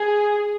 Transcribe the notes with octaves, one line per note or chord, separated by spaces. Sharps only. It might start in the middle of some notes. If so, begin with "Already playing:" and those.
Already playing: G#4